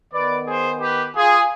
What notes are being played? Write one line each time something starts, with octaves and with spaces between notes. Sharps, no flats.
D#3 B3 B4 D5
G#4 C5
G4 B4
F4 G#4